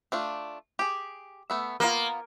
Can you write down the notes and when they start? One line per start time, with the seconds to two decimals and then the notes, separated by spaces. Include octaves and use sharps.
0.12 A3 D4 F4
0.79 G4 G#4
1.50 A3 B3 E5
1.80 A#3 B3 F4